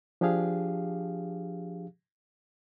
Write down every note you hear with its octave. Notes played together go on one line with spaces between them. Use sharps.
F3 D4 G4 G#4 F5